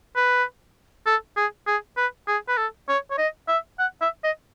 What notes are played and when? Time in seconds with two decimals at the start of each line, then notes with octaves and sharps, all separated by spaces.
0.16 B4
1.06 A4
1.37 G#4
1.67 G#4
1.97 B4
2.28 G#4
2.48 B4
2.57 A4
2.89 C#5
3.11 C#5
3.18 D#5
3.48 E5
3.79 F#5
4.01 E5
4.24 D#5